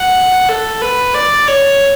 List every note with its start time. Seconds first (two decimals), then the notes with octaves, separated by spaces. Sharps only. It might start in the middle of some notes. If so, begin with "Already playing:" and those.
Already playing: F#5
0.49 A4
0.82 B4
1.15 D5
1.48 C#5